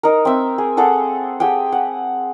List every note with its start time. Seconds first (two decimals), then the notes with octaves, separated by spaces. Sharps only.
0.03 D#4 A#4
0.25 C4 E5
0.58 G#4
0.77 G#4 A4 F#5 D6
1.40 G4 G#4 F#5 G5
1.72 F#5